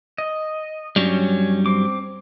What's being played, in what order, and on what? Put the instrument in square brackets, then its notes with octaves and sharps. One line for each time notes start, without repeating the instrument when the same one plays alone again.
[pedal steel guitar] D#5
[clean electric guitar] G2 F#3 G3 [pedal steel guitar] C#4
[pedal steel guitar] C4 D6